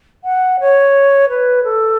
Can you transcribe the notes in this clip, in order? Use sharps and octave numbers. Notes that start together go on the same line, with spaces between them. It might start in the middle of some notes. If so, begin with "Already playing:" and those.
F#5
C#5
B4
A4